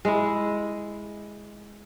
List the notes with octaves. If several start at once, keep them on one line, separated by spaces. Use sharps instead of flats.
G#3 E4